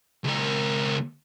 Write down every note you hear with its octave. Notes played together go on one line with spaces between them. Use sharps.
C#2 A#4